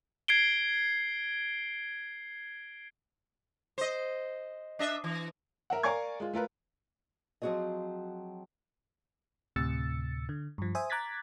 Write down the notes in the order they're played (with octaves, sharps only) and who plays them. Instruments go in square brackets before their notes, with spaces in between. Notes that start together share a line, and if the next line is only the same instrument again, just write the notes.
[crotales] G#6 C7 D7 G7
[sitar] C5 D#5
D4 D#5 E5
E3
[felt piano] A#4 E5 F#5
A#4 D5 F5 G#5 C#6 G#6
G#3 F4
A3 F4 A#4 B4
[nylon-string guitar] F3 F#3 C4 F#4 G#4 D#5
[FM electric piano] D2 A2 C3 E6 A6 C#7
D3
G2 F3
C5 E5 G#5 D#6
A#5 D6 F#6 G#6 A6 B6